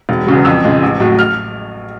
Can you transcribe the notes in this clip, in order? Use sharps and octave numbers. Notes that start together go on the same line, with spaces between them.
E1
E2 C#3 F#3
F2 E6
C#3 F3 G#3
A1
A2 F#3
F6